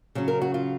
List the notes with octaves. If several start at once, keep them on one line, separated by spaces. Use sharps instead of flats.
C#3 F#3 C#4
A#4
F#4
F4